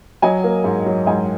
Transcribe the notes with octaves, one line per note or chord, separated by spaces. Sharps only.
F#3 D#5 G#5
A#3
G#2
F#3
G#2 D#5 G#5